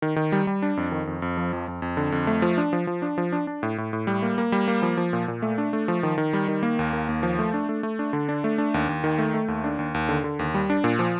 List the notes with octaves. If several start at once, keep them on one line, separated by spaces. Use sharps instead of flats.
D#3
D#3
G3
G3
D4
F2
D#3
F2
F2
F3
F2
F2
F2
D3
F2
A3
F3
D4
F3
F3
D4
F3
D4
D4
A2
A2
A2
G3
A#3
A#3
G3
A#3
F3
F3
A#2
A#2
A3
D4
A3
F3
D#3
D#3
G3
D#3
A#3
D#2
A#3
D#2
F3
A3
D4
A3
A3
D4
D3
D4
A3
D4
D#2
D#2
D#3
A3
A3
D#2
D4
D#2
D#2
D3
D3
D#2
G3
D4
A#2
F3